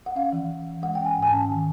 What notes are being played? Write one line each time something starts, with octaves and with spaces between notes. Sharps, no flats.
F#5
C#4 F5
E3
E3
E3
G#3 F#5
C#4 G5
G#5
G#2
G#5
A5
C#4
D#3